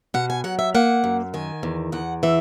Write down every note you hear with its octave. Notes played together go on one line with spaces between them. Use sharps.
B2 F#5
G#5
F#3 F#5
E5
A#3 F#5
F#2
D#3 G#5
E2
E2 F#5
E3 E5